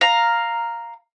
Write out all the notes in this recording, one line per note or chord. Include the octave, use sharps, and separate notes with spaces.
F5 A#5